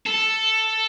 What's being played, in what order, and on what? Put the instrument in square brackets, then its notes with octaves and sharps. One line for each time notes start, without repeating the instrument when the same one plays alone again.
[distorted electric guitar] A4